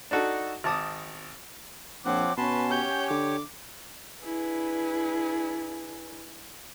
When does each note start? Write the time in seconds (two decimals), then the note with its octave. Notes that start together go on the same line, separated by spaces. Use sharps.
0.11 D4 D#4 F#4 A4
0.64 G#1 A5 D6 D#6
2.05 A#1 F3 C4 C#5 F#5 D6
2.38 B2 C#4 B4 F#5 G#5 A5 C6
2.70 G4 C#5 G6
3.10 D3 D6
4.23 D4 E4 G#4 B4